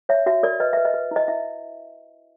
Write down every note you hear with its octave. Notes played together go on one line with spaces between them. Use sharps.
C#5 E5
F#4 E5
A#4 D5
B4 D#5
B4 E5
D#5
B4
E4 D#5
E4 E5